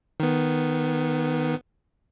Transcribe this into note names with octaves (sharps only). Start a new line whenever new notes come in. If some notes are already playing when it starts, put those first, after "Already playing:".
D#3 B3